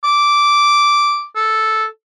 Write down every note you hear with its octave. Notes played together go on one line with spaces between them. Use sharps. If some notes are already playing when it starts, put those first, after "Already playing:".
D6
A4